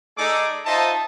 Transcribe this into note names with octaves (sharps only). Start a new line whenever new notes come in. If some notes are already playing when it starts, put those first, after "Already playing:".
A3 D#4 G#4 A4 D5 D6
D#4 F4 C5 D#5 E5 A5